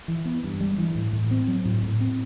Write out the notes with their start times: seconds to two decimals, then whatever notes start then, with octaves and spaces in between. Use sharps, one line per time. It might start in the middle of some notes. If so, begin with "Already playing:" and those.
0.08 E3
0.25 B3
0.43 G2
0.60 G3
0.78 E3
0.95 A2
1.13 A2
1.31 C4
1.47 F#3
1.65 A2
1.83 A2
2.00 C4